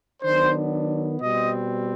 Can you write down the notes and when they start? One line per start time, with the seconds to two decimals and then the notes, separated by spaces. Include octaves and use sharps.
0.23 D#3 F#3 B3 D4 C5
1.20 B2 G3 C4 D#5